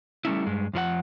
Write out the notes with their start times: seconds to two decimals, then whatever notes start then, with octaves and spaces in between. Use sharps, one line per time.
0.25 G3 A3 C#4 E4
0.46 G2 G#3
0.73 F2 F3 E4 F#5